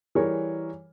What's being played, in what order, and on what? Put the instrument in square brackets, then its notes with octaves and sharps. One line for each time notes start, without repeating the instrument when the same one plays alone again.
[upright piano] E3 G3 G#4 A#4 C#5